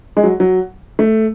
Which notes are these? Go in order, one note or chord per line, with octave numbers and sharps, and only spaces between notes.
G#3
F#3
F#3
A3